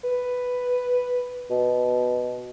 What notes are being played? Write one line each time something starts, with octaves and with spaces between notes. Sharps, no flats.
B4
B2